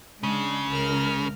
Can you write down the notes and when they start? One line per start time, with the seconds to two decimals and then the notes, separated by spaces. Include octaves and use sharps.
0.23 C#3 G#3 D4
0.68 C#2 A#4 F6